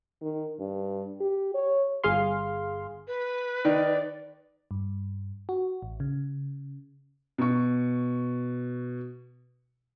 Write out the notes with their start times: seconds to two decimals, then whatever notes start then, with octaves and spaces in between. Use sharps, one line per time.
0.22 D#3
0.59 G2
1.21 G4
1.54 C#5
2.04 G1 G#4 F5 C6
3.07 B4
3.65 D#3 D5
4.71 G2
5.49 F#4
5.82 A1
6.00 C#3
7.38 B2 C#6